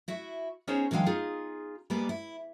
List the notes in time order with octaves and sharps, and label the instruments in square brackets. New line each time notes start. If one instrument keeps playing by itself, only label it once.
[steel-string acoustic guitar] E4 F#4 E5
B3 C#4 D#4 G#4 C5 C#5
D3 E3 F#3 G#3 F5 G5
D#4 F4 G#4
G3 G#3 A#3 B3 B4 D5
E4